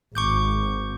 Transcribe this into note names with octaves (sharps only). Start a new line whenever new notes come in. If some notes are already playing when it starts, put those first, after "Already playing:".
G#1 C#6 D6 G6